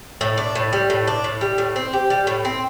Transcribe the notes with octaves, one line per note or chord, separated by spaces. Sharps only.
A2
D4
A2
G3
A2
D4
A2
G3
A2
C4
G4
G3
A2
C4